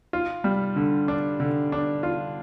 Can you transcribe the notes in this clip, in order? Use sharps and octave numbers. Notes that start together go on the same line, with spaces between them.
F4
G3
D3
D4
D3
D4
F4